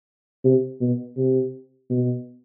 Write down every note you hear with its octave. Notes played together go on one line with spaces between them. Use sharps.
C3
B2
C3
B2